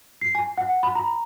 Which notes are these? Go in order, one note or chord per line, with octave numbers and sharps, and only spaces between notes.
C7
G#5
F#5
B5
A#5